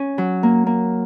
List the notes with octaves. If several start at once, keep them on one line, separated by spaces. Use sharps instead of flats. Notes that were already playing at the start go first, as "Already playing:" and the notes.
Already playing: C#4
F#3
A#3
A#3